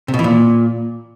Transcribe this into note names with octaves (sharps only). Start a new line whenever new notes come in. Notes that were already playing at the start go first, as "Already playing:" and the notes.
C3
B2
E3
A#2